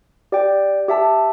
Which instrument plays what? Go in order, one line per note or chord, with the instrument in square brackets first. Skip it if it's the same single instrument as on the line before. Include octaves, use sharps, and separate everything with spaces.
[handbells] G4 D5 G5
G4 E5 A5